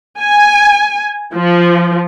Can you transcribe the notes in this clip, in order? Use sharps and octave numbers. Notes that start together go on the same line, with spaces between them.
G#5
F3